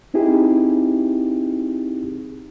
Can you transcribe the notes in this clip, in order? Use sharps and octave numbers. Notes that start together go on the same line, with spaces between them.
C4 D#4 E4 G4 G#4